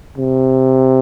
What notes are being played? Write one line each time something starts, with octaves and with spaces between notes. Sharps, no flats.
C3